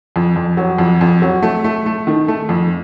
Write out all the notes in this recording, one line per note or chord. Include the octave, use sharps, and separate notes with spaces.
F2
F2
F#3
F2
F2
F#3
A3
A3
A3
D#3
A3
F2